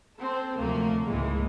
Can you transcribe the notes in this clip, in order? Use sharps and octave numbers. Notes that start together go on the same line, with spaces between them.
C4 A4
D2 C3 F3 F#3 A3 A#3
C#2 G#2 E3 G#3 A#3